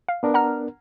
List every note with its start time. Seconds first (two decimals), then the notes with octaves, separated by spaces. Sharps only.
0.09 F5
0.23 B3 D4 A#4
0.34 F#5 A#5 F6